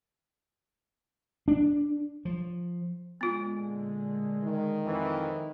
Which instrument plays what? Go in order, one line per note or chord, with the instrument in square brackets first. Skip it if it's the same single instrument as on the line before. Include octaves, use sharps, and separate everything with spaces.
[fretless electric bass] D4
[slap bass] F3
[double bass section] A#2 D3 G#3 [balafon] B3 F4
[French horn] D#3
[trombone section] F2 E3